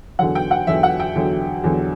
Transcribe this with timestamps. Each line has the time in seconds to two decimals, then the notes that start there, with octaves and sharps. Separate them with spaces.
0.19 E2 D3 F#3 F#5
0.35 G5
0.51 F#5
0.67 E2 D3 F#3 E5
0.83 F#5
1.00 G5
1.15 E2 D3 F#3
1.64 E2 D3 F#3